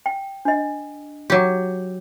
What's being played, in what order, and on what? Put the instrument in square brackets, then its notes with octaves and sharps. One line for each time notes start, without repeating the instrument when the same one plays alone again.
[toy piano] G5
D4 D#5
[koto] F#3 G4